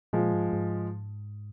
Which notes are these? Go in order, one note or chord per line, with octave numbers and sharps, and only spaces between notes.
A#2 F3 G#3
G#2
G#2